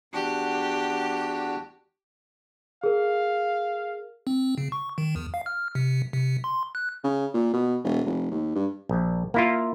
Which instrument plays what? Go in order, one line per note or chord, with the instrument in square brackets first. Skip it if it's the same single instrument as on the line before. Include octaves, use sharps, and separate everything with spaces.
[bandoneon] E2 D4 F#4 [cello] G4
[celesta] G#4 A#4 [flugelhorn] F5
[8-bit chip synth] C4
C#3
C#6
D#3
E2
F5
F6
C3
C3
C6
F#6
[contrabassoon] C#3
A#2
B2
E1
F1
D#2
G2
[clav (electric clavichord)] A#1
A#3 E4 F4